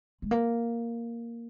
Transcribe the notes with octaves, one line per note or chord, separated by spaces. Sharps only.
G#3
A#3